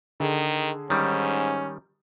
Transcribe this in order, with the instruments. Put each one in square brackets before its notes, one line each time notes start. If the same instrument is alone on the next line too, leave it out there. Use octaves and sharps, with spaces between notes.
[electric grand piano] D3 G#4 [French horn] D#3
[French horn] G#2 [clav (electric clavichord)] D#3 G3 [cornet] C#4